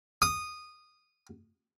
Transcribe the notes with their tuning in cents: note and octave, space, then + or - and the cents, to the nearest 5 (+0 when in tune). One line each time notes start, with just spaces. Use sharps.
D#6 -15